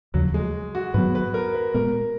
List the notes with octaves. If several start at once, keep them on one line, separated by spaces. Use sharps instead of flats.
D#2 C#3 F3 F#3
G#3
F#4
G#2 D#3 F#3 B3 B4
B4
A#4
B4
A#2 G#3 B3 A#4